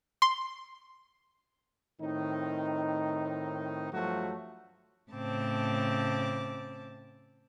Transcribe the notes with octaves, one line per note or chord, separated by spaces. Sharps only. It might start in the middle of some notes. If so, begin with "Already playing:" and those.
C6
A2 D#3 C4 D#4
G2 F3 F#3 A3 F#4
A2 C#3 C4 A5 D6